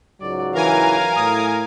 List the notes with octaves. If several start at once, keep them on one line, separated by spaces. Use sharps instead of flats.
C#2 G#2 F#3 D5
E3 A#4 F5 G#5 A#5
A2 D#6